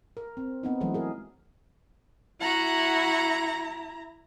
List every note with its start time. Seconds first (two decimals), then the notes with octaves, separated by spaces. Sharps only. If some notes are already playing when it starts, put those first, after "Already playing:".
0.17 A#4
0.37 C4
0.63 B3 C4 D#4
0.81 E3 F#3 G#3 A3
0.94 G#4 A#4
2.40 E4 F#4 F#5 A#5